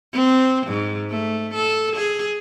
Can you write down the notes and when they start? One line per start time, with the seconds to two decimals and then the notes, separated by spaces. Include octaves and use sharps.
0.13 C4
0.67 G#2
1.10 A3
1.55 A4
1.96 G#4